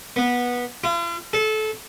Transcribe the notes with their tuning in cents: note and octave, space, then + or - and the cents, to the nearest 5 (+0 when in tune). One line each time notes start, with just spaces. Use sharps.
B3 -15
F4 -45
A4 -25